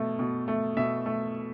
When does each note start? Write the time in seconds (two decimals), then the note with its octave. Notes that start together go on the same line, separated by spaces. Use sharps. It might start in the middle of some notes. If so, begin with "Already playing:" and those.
Already playing: B2 A3
0.19 B2
0.48 A3
0.77 B2 E5
1.06 A3